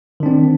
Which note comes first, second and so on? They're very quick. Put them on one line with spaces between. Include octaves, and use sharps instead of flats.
D#3 D4 C4